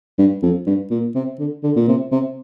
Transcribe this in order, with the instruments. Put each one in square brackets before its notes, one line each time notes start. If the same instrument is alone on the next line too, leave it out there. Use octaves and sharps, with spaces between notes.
[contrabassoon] G2
F2
G2
A#2
C3
D3
D3
A#2
C3
C3